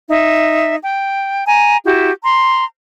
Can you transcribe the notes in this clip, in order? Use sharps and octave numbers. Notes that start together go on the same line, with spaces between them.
D#4 E5
G5
G#5 A#5
E4 F#4 G4
A#5 C6